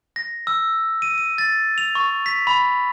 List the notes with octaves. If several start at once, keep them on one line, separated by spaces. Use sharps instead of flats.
A#6
E6
D#7
D#7
A6
F7
C#6
B6
B5